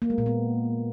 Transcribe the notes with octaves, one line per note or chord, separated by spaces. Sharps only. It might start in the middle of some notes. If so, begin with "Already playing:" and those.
A#3
G#3
A#2
B3